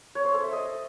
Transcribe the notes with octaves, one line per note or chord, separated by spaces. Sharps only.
C#5
C5
A4
E5
D#5